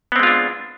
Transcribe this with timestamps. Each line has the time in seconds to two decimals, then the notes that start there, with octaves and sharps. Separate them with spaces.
0.12 B3
0.16 C4
0.19 G#3
0.23 F4
0.27 D4